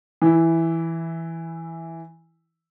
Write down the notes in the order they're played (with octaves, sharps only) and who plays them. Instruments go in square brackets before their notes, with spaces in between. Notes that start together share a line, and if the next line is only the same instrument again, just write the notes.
[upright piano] E3 E4